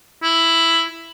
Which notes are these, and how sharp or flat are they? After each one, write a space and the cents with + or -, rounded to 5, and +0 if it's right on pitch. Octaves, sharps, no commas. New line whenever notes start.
E4 +5